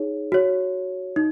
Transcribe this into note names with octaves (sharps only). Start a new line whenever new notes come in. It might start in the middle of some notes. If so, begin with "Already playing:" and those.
Already playing: D#4 G#4 C#5
F#4 C#5
D#4